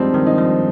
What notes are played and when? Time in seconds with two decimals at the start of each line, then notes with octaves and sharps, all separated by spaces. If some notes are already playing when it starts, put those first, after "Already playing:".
Already playing: G2 F3 G3 G#3 C4 D4 D#4
0.14 D#3
0.27 D#4
0.38 F3